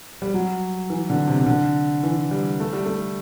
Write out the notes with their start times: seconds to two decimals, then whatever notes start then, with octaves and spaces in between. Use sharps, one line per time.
0.22 G3
0.34 F#3
0.90 E3
1.10 D3
1.28 C3
1.39 C3
1.46 D3
2.03 E3
2.31 G3
2.60 A3
2.73 G3
2.86 A3